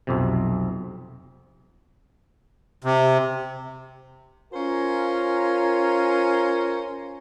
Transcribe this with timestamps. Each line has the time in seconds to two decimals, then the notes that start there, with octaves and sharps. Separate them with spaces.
0.07 B1 F2 C3
2.84 C3
4.53 C#4 F4 A#4 C5 G#5 A#5